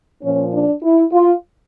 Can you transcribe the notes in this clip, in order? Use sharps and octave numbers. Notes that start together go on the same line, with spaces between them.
A#2 F3 C#4
D4
E4
F4